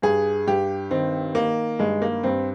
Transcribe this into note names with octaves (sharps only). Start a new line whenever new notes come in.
G2 G#4
G2 G4
D#3 C4
D#3 A#3
G2 G#3
A#3
G2 C4